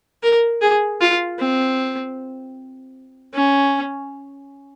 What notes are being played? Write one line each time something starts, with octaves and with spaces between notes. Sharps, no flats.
A#4
G#4
F4
C4
C#4